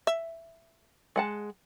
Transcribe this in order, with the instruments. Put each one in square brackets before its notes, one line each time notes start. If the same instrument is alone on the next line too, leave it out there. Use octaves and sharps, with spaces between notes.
[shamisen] E5
[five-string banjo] G#3 F#5 A5